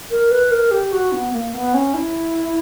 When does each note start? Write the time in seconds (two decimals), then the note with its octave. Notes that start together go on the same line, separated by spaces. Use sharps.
0.11 A#4
0.31 B4
0.51 A#4
0.71 G4
0.92 F#4
1.12 B3
1.33 A#3
1.54 B3
1.74 C#4
1.94 E4